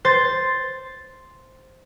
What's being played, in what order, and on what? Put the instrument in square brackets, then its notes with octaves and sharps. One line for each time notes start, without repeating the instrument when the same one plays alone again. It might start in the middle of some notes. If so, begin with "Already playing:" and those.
[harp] C5 A6